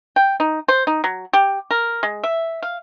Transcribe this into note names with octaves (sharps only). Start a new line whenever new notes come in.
G5
D#4
C5
D#4
F#3
G4
A#4
G#3
E5
F5